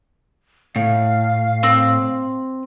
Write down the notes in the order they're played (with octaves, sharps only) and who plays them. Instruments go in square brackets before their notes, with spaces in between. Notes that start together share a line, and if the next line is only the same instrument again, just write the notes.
[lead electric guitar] A2 [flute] F5
[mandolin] C4